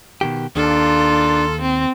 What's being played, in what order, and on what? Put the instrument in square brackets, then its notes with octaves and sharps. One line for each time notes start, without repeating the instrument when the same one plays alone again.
[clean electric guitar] B2 D#3 G4
[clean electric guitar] D#2 [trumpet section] A#3 F4 [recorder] D4 [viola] A4
[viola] C4